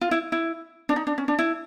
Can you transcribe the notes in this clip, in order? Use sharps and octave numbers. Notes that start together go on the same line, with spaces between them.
F4
E4
E4
D4
D#4
D4
C#4
D4
E4